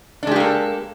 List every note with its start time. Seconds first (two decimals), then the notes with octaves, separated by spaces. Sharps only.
0.23 D4
0.27 G#3
0.31 G4
0.36 A#3
0.40 A4